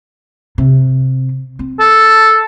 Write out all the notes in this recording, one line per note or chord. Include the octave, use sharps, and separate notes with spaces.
C3
C4
A4